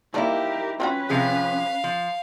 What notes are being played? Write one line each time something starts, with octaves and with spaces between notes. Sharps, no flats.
F3 A#3 D#4 E4 G4 A#4 D5
C4 C#4 F4 F#4 B4
C3 F3 G#4 F5
F3